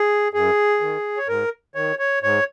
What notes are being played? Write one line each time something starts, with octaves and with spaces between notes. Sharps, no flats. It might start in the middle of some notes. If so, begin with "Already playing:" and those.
Already playing: G#4
F#2 G#4
D#3
C#5
G#2 A#4
D#3 C#5
C#5
G#2 C#5